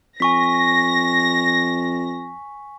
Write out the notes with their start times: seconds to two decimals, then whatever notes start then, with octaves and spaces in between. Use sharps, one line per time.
0.20 F2 G#5 C#6 A#6 B6